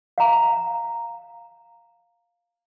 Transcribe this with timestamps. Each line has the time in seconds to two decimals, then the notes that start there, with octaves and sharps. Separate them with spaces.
0.18 F5 A#5